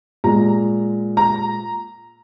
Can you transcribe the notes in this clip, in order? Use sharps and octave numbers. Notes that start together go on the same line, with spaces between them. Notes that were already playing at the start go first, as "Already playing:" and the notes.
A#2 G#3 A#5
A#5